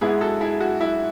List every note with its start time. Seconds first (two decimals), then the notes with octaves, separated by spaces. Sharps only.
0.01 G#2 G#3 B3 E4 G#4
0.21 F#4 A4
0.41 E4 G#4
0.61 F#4
0.81 E4